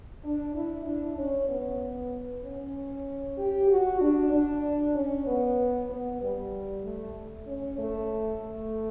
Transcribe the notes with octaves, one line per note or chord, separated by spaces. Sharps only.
D4
E4
D4
C#4
B3
C#4
G4
F#4
D4
D4
C#4
B3
B3
G3
A3
C#4
A3
A3